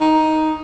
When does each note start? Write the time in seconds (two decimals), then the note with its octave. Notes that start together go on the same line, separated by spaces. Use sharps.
0.01 D#4